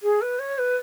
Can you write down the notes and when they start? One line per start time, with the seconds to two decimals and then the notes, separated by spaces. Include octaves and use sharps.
0.02 G#4
0.21 B4
0.39 C#5
0.58 B4